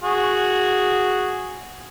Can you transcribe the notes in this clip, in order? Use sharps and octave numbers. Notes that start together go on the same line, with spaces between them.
F#4 G#4